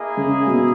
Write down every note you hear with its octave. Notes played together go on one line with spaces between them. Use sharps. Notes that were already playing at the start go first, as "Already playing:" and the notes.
Already playing: A#3 E4 G#4 D#5
C#3
B2